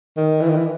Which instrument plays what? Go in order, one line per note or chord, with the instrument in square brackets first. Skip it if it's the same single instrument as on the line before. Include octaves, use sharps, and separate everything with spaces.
[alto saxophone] D#3
E3
D#3
E3